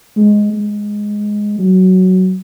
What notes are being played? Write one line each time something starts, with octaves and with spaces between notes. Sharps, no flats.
G#3
G#3
F#3